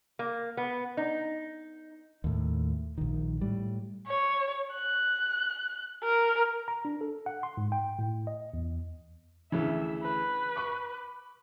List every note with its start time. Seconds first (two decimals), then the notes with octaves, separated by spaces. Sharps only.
0.19 A#3
0.57 B3
0.97 D#4
2.24 D#2 A2
2.98 A#1 D#3
3.41 A2 G3
4.08 C#5
4.74 F#6
6.04 A#4
6.68 A#5
6.85 D4
7.01 A4
7.26 F#5
7.43 C6
7.57 G#2
7.72 G5
7.99 A2
8.27 D#5
8.54 E2
9.52 D2 C#3 E3 E5
10.04 B4
10.56 B5 C#6 D6